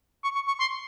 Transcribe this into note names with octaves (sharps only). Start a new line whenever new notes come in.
C#6
C#6
C#6
C6